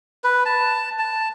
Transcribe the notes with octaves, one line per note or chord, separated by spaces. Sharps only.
B4
A5
A5